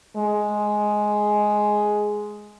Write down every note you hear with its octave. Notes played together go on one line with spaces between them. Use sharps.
G#3